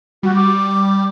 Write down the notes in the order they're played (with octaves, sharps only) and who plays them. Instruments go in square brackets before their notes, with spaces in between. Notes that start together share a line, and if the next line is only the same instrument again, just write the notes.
[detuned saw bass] G3 [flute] F#4
[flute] D6